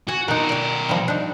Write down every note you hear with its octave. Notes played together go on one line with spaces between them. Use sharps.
F#4 G#5
B2 D#4 F#4 A#4
D5 G5
F3 G3
D4 D#4